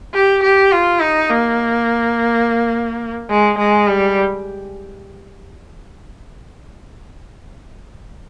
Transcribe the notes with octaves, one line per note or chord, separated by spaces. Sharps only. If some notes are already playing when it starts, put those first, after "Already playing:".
G4
G4
F4
D#4
A#3
G#3
G#3
G3